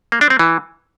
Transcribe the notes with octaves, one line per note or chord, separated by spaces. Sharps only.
A#3
D4
C4
E3